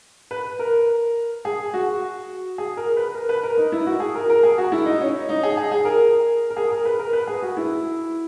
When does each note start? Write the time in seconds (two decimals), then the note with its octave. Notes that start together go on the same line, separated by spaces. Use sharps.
0.31 B4
0.59 A#4
1.45 G#4
1.74 F#4
2.58 G#4
2.77 A#4
2.97 B4
3.15 A#4
3.29 B4
3.43 A#4
3.57 D#4
3.72 E4
3.86 F#4
4.00 G#4
4.15 A#4
4.30 A#4
4.43 G#4
4.58 F#4
4.72 E4
4.85 D#4
5.01 C#4
5.29 D#4
5.43 G#4
5.57 G#4
5.72 G#4
5.85 A#4
6.50 A#4
6.57 G#4
6.71 A#4
6.85 B4
6.99 A#4
7.13 B4
7.27 G#4
7.42 F#4
7.57 E4